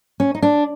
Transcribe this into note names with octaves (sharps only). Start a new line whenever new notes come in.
C#4
D#4
D4